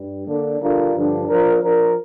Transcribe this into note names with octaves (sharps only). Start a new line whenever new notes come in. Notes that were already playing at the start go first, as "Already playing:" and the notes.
Already playing: G2 G3
D3 A#3 D4
D3 G3 D4 F4 A#4
G2 D3 F3 D4
F3 D4 A#4
F3 D4 A#4